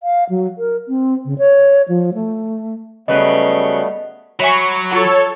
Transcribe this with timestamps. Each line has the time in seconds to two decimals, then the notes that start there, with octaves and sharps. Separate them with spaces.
0.03 F5
0.30 F#3
0.58 A#4
0.88 C4
1.25 C#3
1.38 C#5
1.88 F3
2.14 A3
3.08 C#3 F#3 G3 A3 B3 B4 D#5
4.40 F#3 C#5 E5 G#5 B5 C#6
4.91 F4 A4 C#5 F#5